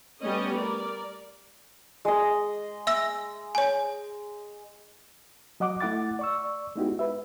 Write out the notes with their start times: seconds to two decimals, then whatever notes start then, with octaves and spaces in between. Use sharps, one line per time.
0.21 G3 A3 B3 C#4 D#5
0.54 A#4 D5
2.05 G#3 D#5
2.87 E5 E6 A#6
3.55 C#5 G#5
5.60 F#3 D#5 F#5 D6
5.81 A3 E4 F#5 D6 A6
6.19 D5 C#6 E6
6.76 G#3 B3 D#4 E4 F#4 G4
6.99 B4 E5